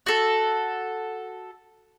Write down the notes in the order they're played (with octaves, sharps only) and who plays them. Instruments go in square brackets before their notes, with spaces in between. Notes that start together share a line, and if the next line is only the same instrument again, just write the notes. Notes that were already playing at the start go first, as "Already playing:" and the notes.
[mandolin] F#4 A4